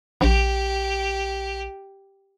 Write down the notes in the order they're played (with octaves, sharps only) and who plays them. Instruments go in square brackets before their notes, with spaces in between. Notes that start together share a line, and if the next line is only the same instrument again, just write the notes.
[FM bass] A#1 [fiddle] G4